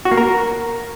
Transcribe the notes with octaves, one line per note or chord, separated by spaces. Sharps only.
F#4
A#3
A#4